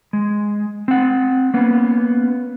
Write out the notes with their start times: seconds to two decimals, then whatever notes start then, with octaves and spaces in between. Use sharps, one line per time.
0.13 G#3
0.88 C4 F#5
1.54 A#3 B3 C#4